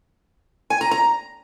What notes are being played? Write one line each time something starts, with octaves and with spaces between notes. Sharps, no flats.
G#5
A#5
A#5